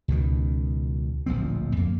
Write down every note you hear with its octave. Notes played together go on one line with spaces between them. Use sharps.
C#2 B2 D#3
D1 A#1 F3 C4
F2 A#3